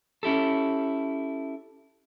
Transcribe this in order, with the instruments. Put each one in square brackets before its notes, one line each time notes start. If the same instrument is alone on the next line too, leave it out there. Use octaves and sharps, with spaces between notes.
[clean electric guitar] C#4 E4 G4 A4